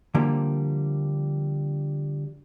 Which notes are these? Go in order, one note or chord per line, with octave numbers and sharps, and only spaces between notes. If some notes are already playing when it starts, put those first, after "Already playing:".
D3 F3 G3 A#3